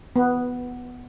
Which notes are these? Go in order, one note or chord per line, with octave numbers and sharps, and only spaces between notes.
B3